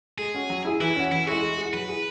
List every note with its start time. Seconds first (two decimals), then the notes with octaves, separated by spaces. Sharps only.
0.18 G#3 G#4
0.34 C#4 F#4
0.50 F#3
0.65 E4 G#4
0.81 E3 E4
0.96 C#4 F#4
1.11 E3 E4
1.27 G#3 E4 F#4 G#4
1.42 G#3
1.58 E4 G#4
1.73 F#3 B4
1.89 E4 G#4